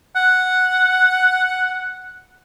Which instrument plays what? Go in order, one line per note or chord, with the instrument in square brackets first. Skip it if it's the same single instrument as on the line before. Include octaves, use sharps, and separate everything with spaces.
[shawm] F#5